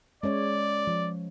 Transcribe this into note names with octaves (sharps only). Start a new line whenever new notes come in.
G#3 C#4 C#5 D5
F3